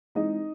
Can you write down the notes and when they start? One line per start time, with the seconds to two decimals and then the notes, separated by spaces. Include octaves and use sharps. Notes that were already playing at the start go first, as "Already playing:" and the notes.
0.15 E3 G#3 C4 D#4 D#5